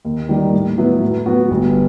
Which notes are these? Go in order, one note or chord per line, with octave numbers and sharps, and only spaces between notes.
D#2
D#3 G3
A2
F#3 B3 E4
A2
F#3 B3 F#4
G1